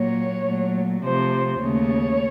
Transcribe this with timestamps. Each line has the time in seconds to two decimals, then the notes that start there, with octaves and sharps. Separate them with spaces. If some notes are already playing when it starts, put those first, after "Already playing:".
Already playing: A#2 F#3 A#3 C#5
0.45 A#2 F#3 A3
1.03 C3 F3 A3 C5
1.61 D#2 C#3 A3 C#5